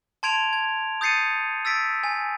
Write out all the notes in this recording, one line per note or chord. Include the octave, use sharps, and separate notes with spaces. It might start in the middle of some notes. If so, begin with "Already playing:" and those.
A5 C6 G#6 D7 F7
G#6
D#6 G6 A6 C7 C#7 D#7
E6 A6 B6 D7
G#5